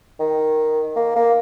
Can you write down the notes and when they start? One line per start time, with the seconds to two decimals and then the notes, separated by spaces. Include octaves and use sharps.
0.20 D#3
0.96 A#3
1.16 A#3